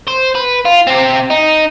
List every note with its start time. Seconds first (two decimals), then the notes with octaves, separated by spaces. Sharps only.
0.08 C5
0.35 B4
0.65 F4
0.87 C4 G4
1.30 D#4